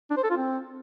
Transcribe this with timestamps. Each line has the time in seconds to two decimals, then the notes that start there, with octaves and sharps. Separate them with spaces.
0.10 D4
0.17 C5
0.24 A4
0.30 F4
0.37 C4